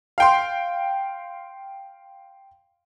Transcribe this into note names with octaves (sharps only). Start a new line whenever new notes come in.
F5 G5 C6